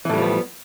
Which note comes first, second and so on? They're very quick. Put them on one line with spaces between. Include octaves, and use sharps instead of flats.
E3 A2 G3 F3 B3